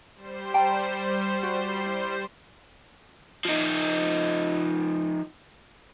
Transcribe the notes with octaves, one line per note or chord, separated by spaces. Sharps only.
G3 C5
G5 A#5
F#4
E4
F3 D#4